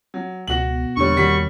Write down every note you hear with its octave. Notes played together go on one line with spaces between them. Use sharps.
F#3
C#2 B2 B3 F#4 F#7
E2 D3 G3 A#3 C#5 C#6
D#3 G3 F#4 B6